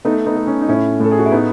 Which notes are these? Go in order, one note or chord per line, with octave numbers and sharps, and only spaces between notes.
A3 B3 D#4
B3 D#4
A3
C#4
D#4
A2 C#4 E4
A2 A4
G#4
F#4
E4
A3 B3 D#4